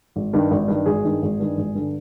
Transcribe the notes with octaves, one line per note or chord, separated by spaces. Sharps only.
G#1
G2 D#3
G#1
G2 D#3
G#1 G#4
G2 D#3
G#1
G2 D#3
G#1
G2 D3